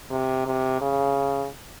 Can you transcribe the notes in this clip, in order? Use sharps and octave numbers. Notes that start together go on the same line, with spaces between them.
C3
C3
C#3